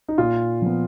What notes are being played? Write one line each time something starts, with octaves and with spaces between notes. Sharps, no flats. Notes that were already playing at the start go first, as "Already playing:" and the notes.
D#4
A#2 F4
F3 B3